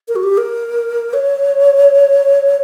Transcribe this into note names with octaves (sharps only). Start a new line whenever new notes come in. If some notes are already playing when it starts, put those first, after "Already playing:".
A#4
F#4
G4
A#4
C#5